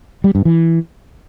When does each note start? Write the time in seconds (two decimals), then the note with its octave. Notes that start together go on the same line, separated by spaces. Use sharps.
0.24 G3
0.35 G2
0.45 E3